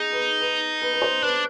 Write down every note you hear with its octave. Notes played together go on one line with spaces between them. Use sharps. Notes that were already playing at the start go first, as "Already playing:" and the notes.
Already playing: D#4 G#4
B4
B4
B4
B4
C5
D4 B4